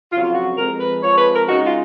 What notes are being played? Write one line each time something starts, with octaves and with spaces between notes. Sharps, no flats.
F2 C#3 F#3 F4
F4
F#4
F2 F3 G#3 A#4
B4
F2 F3 G#3 C#5
B4
A#4
C#3 G#3 D#4 F#4
F4